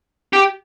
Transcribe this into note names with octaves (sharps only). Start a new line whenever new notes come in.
G4